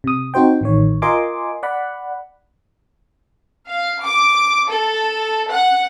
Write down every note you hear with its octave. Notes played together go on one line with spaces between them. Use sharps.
C3 D#6
C4 D#4 F#4 C5 G5
A1 D#3 C#5
F4 A#4 D#5 G#5 C6 D6
D5 F#5 B5
F5
D6
A4
F#5